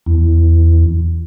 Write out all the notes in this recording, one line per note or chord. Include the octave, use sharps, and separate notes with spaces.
E2